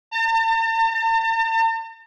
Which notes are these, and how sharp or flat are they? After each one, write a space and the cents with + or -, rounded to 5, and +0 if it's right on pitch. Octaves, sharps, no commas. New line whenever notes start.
A5 +45